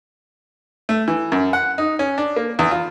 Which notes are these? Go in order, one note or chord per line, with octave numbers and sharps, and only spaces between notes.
A3
E3
F#2
F#5
D#4
C#4
D4
A#3
E2
F4